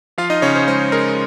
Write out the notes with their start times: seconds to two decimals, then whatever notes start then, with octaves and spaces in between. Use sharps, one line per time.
0.18 F3 F4 F5
0.30 D#4 D#5
0.42 C#3 C#4 C#5
0.55 C5
0.68 G#3 C5
0.92 G#3 A#4